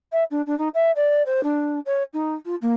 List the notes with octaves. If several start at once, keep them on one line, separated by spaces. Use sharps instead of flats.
E5
D4
D4
D#4
E5
D5
C5
D4
C#5
D#4
F4
A#3